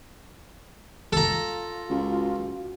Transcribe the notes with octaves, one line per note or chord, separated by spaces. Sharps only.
F4 A4 A#5
C#2 F#4